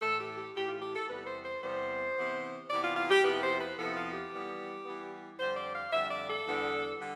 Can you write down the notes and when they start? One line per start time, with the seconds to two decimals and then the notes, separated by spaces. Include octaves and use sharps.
0.01 A2 E3 A3 A4
0.20 G4
0.37 G4
0.56 A2 E3 A3 G4
0.68 F4
0.82 G4
0.95 A4
1.09 E2 C3 G3 B3 B4
1.27 C5
1.45 C5
1.63 E2 C3 G3 B3 C5
2.17 C3 E3 B3
2.70 C3 E3 B3 D5
2.84 F4
2.97 F4
3.11 G4
3.24 F2 C3 F3 B3 E4 B4
3.42 C5
3.60 B4
3.78 F2 C3 F3 B3 E4 A4
3.96 F4
4.14 G4
4.32 E3 G3 B3
4.85 E3 G3 B3
5.38 F2 D3 G3 C5
5.57 D5
5.75 F5
5.93 F2 D3 G3 E5
6.11 D5
6.28 A4
6.46 E2 D3 G3 B3 D4
7.00 D3 G3